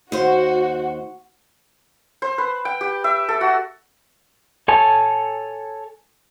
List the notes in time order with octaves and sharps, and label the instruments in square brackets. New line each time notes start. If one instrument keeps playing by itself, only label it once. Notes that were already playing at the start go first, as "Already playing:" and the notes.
[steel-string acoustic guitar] D#2 C5 [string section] F#4
[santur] C5
B4
G5
G4
E5
A4
F#4
[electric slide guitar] A4 C#5 G#5 A5